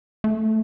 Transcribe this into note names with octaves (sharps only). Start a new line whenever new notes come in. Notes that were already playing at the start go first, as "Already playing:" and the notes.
A3